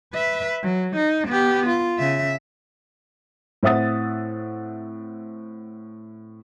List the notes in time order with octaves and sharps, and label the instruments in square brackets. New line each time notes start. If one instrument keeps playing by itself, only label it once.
[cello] B4 E5
F#3
D#4
B3 G4
F4
C#3 E5
[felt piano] A2 C4 E5 F#5 D#6 A6